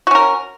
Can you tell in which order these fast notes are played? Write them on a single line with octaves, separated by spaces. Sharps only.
F#4 C#4 A#4